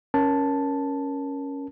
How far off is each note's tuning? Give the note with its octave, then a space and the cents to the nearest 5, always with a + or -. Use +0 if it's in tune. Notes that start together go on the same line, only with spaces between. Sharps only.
C#4 +0 A#4 +15 A5 +0